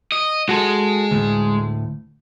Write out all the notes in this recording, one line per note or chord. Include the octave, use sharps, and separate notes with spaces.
D#5
G#3 F#4 A4
D2 A2